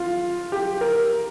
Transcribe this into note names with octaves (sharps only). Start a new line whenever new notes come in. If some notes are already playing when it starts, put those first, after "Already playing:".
Already playing: F4
G4
A#4